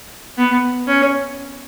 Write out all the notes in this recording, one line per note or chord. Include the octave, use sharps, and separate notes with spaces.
B3
C#4